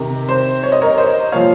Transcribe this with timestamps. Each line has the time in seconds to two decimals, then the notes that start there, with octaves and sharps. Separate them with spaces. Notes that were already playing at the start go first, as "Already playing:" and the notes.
Already playing: C3 D#3
0.29 C5
0.63 C#5
0.72 D#5
0.82 A#4 C#5
0.97 C5 D#5
1.32 A#2 F3 C#5 F5